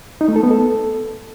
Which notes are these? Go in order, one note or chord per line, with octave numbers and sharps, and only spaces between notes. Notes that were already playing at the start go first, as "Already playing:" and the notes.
D#4
A3
A4
B3
A4